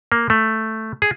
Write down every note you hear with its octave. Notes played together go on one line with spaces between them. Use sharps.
A#3
A3
G#4